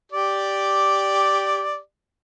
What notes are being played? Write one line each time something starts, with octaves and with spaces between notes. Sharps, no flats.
G4 D5